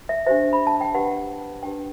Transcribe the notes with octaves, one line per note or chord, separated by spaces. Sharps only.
E5
D4 G4 C5 E5
B5
A5
G5
D4 G4 B4 F#5
D4 G4 B4 G5